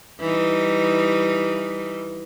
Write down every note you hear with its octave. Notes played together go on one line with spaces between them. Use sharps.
E3 G3 D#4